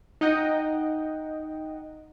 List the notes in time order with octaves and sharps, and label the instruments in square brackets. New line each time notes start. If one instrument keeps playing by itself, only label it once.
[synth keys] D#4 D#5 F#5 G5